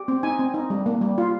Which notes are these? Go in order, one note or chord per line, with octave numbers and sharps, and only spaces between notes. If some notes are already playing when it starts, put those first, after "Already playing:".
Already playing: G4
C4
D#4 G#5
C4
D#4
G3
A#3
G3
F4